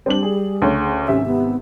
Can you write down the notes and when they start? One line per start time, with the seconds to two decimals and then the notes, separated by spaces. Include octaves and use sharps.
0.06 G3 C4 D4 F#7
0.23 G#4
0.62 D2 C#3 C#5
1.08 G#1 C3 C#4 E5
1.26 B3